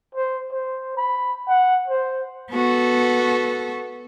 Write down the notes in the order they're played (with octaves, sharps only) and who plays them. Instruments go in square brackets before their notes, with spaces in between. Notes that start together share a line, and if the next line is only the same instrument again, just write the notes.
[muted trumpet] C5
C5
B5
F#5
C5
[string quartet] B3 F#4 A4